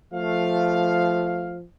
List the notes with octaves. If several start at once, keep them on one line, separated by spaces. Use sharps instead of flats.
F3 A3 F5